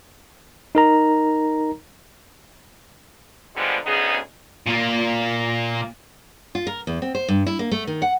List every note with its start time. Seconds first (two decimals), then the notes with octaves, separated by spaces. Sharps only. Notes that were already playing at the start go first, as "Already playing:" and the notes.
0.75 D#4 A#4 A#5
3.55 D3 F3 G3 G#3 B3
3.85 D2 C#3 B3 D#4 G#4
4.67 A#2 A#3
6.55 F4
6.67 A#4
6.87 E2
7.02 C4
7.15 C5
7.28 G2
7.47 E4
7.59 A#3
7.71 A3
7.87 D#3
8.02 F#5